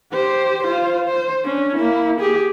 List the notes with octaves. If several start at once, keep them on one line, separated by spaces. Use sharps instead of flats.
G4 C5
F4 C5
C5
C#4 D4
A#3 E4
G4 G#4